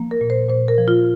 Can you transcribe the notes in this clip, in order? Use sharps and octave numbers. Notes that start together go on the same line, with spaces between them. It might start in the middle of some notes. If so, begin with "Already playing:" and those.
Already playing: F3 A#3
A#4
A#2
C5
A#2 C5
A#4
F3
F4